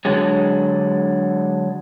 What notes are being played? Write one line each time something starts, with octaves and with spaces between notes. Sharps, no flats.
D3 F#3 G#3